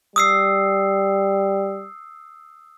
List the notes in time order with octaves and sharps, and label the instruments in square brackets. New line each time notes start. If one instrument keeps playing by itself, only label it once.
[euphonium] G3 [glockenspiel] D#6 E6 C7